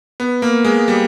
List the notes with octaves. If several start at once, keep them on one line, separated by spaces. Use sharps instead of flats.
B3
A#3
G#3
G3